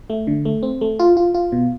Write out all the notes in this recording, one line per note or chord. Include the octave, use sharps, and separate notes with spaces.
A3
D3
A3
C4
A3
F4
F4
F4
B2